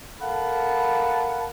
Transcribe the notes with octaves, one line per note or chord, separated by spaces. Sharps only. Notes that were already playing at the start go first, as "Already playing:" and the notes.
A4 A#4 F5 F#5 A5 B5